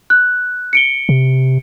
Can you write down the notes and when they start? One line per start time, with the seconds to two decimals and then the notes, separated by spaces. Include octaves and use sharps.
0.10 F#6
0.73 C#7 D7 G7
1.09 C3